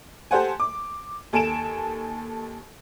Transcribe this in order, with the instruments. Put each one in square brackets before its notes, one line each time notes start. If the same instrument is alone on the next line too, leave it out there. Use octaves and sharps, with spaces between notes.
[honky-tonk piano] G4 A4 C5 F#5 G#5
D6
D#2 A4 G#5 D7 E7